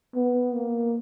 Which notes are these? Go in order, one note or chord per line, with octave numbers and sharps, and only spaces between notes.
B3
A#3